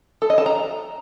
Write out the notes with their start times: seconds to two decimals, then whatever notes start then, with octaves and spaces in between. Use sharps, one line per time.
0.22 A4
0.30 D#5
0.38 A5
0.46 A#5